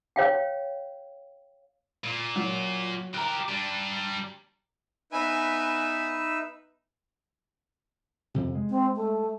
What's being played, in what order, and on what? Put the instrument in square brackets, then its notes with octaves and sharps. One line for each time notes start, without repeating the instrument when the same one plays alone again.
[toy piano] C#5 F5 G5
[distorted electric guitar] A#2
[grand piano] F#3
[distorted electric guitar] G4 A#4 [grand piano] A#5 F#6
[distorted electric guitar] G3 D4
[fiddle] B3 G#5 [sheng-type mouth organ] D#4 B4 E5
[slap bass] F2 C3
G#3
[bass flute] C4
A3